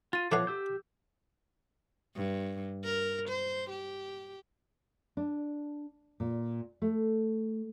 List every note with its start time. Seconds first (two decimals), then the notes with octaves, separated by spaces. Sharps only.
0.13 F4 A6 D#7
0.32 F3 A3 B3 C#5 F5 D6 F#6
0.47 G4 E6 G6
2.16 G2
2.85 A#4
3.28 C5
3.70 G4
5.17 D4
6.20 A#2
6.82 A3